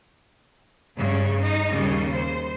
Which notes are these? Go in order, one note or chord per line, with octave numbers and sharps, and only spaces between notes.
G2 C#3
D#4
D#2 C#3 G3
C5